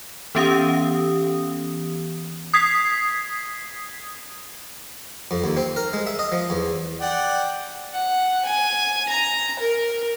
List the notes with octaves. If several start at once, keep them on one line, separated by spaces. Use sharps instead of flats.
E3 B3 C#4 G4 F5 D#6
D#6 G#6 B6 C7
F2
D#2
C4
A#4
G#3
E5
D#5
F3
E2
D5 F#5 G5
F#5
G#5
A#5
A#4